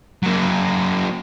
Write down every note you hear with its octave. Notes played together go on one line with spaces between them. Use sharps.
F#3 A#3